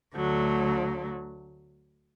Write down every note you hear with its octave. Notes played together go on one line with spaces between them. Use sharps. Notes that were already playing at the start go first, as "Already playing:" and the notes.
D2 D3 F#3 A3